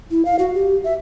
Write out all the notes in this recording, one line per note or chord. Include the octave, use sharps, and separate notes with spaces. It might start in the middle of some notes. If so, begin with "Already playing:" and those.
E4
F5
F#4
G4
E5